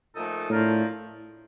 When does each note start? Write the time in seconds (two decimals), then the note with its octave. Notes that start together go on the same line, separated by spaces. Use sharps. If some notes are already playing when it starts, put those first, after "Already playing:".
0.14 A#2 F3 A3 D#4 A4
0.50 A2 F3 A3 D4 F4 A#4